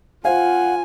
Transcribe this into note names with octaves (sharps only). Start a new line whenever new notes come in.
F4 C5 F5 F#5 G#5